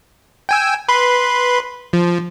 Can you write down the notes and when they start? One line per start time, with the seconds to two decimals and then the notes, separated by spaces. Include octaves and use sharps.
0.49 G5 G#5 E6
0.89 B4 B5 C6
1.93 F3